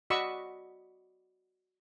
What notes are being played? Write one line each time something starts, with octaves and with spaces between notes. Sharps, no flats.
F#4 D5 D#5 B5 C#6 E6